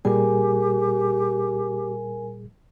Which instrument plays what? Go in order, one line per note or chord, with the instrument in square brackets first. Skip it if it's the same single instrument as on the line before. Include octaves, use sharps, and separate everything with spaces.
[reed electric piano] A#2 G3 G#4 [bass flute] G4 [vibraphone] A#4 G#5